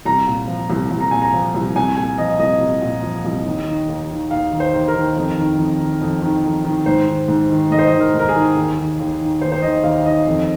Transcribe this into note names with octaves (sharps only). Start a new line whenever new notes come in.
C2 A#5
A#2
F3
C2
C2
A#5
A#2 G#5
A#5
F3
C2
C2 G#5
A#2 G#5
F3 D#5
C2 D#5
C2
A#2
F3
C2
D#2
D#3
D#2
D#3
D#2 F5
D#3
C5
D#2
A#4
D#3
F2
D#3
F2
D#3
F2
D#3
F2
D#3
G#2 C5
D#3
G#2
D#3
G#2 D#5
C5
D#5
D#3
A#4
G#2
A#4
G#4
D#3
D#2
D#3
D#2
D#3
D#2 C5
C5
D#3 D#5
D#2 F5
D#3 D#5
F2